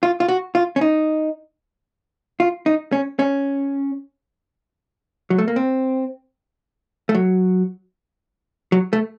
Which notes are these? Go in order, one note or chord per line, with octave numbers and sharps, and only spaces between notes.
F4
F4
F#4
F4
C#4
D#4
F4
D#4
C#4
C#4
F#3
A3
A#3
C4
A3
F#3
F#3
A3